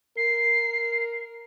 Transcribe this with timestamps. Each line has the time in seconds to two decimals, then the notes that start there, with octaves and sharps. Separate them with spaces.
0.17 A#4 C7